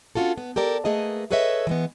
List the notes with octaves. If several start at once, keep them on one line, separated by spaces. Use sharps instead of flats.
C#4 D4 F4 F#4 A4
B3
G4 A4 A#4 D5
A3 A#3 G#4 B4 D#5
G#4 A4 B4 C#5 D#5 E5
E3 G#3 B3